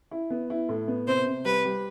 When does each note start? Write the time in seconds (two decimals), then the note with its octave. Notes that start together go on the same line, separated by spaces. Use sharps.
0.11 E4
0.30 B3
0.50 E4
0.69 A2
0.88 B3
1.07 C3 C5
1.26 C3
1.45 G3 B4
1.65 G3